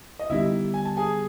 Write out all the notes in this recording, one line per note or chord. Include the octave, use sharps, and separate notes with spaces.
D#5
D3 G3 B3 D#4 E4 G4 E5
G#5
A5
G#4 G#5